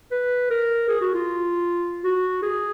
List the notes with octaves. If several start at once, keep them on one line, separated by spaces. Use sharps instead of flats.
B4
A#4
G#4
F#4
F4
F#4
G#4